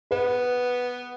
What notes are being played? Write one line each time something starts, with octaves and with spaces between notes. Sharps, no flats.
B3 B4